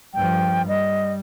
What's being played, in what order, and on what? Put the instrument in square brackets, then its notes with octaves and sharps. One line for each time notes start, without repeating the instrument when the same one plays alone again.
[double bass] G2 F3 [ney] G5
[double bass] G3 [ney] D#5